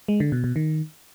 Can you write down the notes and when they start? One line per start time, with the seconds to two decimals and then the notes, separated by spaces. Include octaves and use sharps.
0.08 G#3
0.20 D3
0.32 B2
0.44 B2
0.56 D#3